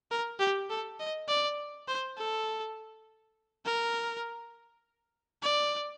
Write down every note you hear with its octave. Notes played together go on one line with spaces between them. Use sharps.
A#4
G4
A4
D#5
D5
C5
A4
A#4
D5